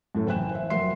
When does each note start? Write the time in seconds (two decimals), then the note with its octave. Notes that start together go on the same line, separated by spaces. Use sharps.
0.15 F#2 A2 A3
0.27 F#1 E2 G5 G#5 F#6 E7
0.51 C5 E5
0.70 F1 F#3 A#4 E5 C6 C7